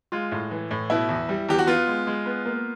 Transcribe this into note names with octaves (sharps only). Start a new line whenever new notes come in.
G#3 F4
A2
E3
A2
B2 E4
E2
G3
E2 G4
F#4
B3 F4
G#3
G#3
B3
A#3